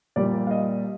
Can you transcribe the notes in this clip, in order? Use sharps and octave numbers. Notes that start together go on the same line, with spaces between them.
A#2 G3 A#3 D5
F5
D#5